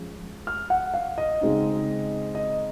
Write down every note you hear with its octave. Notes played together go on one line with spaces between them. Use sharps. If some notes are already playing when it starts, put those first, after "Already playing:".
Already playing: F3 G#3 C#4
F6
F#5
F5
D#5
C#3 G#3 C4 D#4
D#5